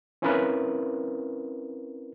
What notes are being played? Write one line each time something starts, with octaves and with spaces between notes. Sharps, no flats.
C4 C#4 E4 F4 A#4 B4